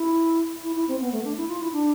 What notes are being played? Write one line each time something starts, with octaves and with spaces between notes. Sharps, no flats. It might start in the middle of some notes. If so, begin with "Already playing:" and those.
Already playing: E4
E4
E4
C4
B3
A3
D4
E4
F4
E4
D4